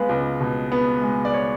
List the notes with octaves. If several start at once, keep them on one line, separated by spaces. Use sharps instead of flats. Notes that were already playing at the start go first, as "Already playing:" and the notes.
Already playing: G#3 B3 B4 F5
C#2
B2
B3
G#3
D5
C#5